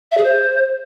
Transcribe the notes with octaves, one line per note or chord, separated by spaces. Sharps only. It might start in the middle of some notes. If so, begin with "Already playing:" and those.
E5
G#4
C5